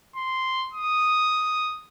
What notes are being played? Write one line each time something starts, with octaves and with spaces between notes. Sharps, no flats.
C6
D#6